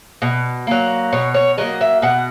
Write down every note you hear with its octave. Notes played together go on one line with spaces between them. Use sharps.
B2
F#3 A#3
B2 C#5
C#5
F#3 A#3 D#5
E5
B2 F#5